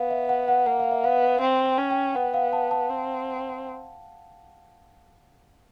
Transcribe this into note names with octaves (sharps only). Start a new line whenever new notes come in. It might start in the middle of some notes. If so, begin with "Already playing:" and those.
Already playing: B3 F5
E5
F#5
F#5
A#3 F#5
F5
E5
B3 F5
C4 G5
G5
C#4
G5
B3 F#5
F5
A5
A5
C4